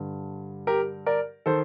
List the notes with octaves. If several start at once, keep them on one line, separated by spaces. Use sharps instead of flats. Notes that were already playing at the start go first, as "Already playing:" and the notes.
Already playing: G2 D3
G4 A#4
A#4 D5
D#3 A4 C5